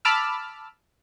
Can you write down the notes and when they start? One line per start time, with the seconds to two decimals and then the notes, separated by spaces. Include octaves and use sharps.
0.05 A5 B5 D6 E6 F6